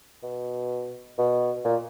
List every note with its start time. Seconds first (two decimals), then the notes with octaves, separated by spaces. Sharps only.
0.23 B2
1.18 B2
1.65 A#2